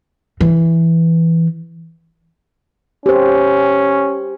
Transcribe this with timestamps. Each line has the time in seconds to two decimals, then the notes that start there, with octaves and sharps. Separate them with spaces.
0.41 E3
3.06 C#4 G4 C5